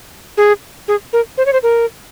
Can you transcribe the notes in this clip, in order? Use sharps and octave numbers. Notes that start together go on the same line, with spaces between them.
G#4
G#4
A#4
C5
C#5
C5
A#4